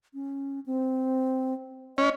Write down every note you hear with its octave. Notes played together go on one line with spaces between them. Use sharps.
C#4
C4
C#4 D#5